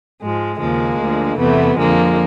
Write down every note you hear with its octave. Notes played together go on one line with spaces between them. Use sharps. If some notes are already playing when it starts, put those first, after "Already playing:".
G#2 F3 G#3
D#2 C#3 F3 G#3 A#3
D2 D3 F3
E2 C3 E3 A3 B3
F2 D3 F3 G#3 A#3